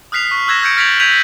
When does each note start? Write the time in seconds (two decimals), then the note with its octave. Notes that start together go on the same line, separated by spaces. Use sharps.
0.12 D#6 F6 F#6 B6 C7 F7
0.31 C#6
0.48 E6 F#6 G#6 A#6 E7
0.63 F6 G6 G#6 C#7 D7
0.77 F6 A6 B6 D7 F7 F#7
1.00 F6 G6 G#6 B6 D#7 F7